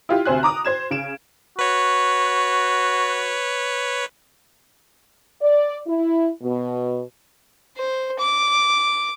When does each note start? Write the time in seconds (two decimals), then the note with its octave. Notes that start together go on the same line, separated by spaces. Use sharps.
0.09 E4 F4 G4
0.25 D2 C3 C5 G#5 F#6
0.43 A#5 D6 D#6
0.65 C5 G#6 E7
0.91 C#3 D7 E7
1.59 F#4 B4 C#5
5.42 D5
5.87 E4
6.42 B2
7.77 C5
8.19 D6